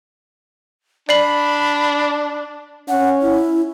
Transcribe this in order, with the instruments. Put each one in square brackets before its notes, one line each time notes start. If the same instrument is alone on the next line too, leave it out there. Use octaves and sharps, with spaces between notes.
[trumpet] D4 [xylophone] D5 C7 F#7 [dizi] B5
[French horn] C#4 [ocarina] F#5
[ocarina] E4